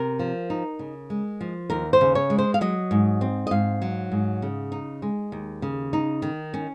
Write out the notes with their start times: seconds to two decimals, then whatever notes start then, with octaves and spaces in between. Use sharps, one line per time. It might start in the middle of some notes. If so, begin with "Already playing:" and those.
Already playing: C3 A#4
0.19 F3
0.50 D#4
0.79 C#3
1.10 G#3
1.41 F3
1.70 D#2 A#4
1.93 C5
2.01 C#3
2.15 C#5
2.30 G#3
2.38 C5
2.54 F5
2.61 F#3 D#5
2.91 G#2
3.21 C4
3.47 D#5
3.51 G#2 F5
3.82 F#3
4.12 G#2
4.42 C#3
4.72 D#4
5.02 G#3
5.32 D#2
5.62 C#3
5.93 D#4
6.22 D#3
6.54 C#4